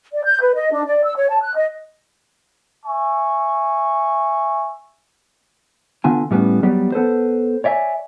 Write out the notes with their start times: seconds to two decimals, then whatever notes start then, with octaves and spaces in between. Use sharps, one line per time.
0.12 D5
0.24 G6
0.41 B4
0.54 D#5
0.72 D4
0.86 D5
1.04 E6
1.16 C#5
1.29 A5
1.42 F#6
1.55 D#5
2.85 E5 G#5 C#6
6.04 D3 B3 F4 G#5
6.31 A2 G3 B3 C#4
6.63 F#3 G3 B3 G4 D5
6.92 B3 A4 B4 C5
7.64 C#5 D5 E5 G5 G#5